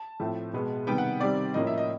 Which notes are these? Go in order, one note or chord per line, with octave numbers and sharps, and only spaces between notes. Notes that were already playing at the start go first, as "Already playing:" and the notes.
Already playing: A5
A2 F3 A3 C4
B2 G#3 B3
C3 D#3 G3 B3 G5
F#5
C3 D#3 G3 C4 D5
A2 F3 A#3 C#4 D#5
E5
D#5